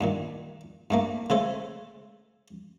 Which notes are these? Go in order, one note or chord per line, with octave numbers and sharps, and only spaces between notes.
G2 A#2 D#3
G2 A3 A#3
C#3 G#3 A3 A4 C5